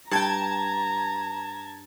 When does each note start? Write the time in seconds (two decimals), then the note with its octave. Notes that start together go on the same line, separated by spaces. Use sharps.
0.11 G2 G5 A5 A#5 G#6